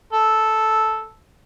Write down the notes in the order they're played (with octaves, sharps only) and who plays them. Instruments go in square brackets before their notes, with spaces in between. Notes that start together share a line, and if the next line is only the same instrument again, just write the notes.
[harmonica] A4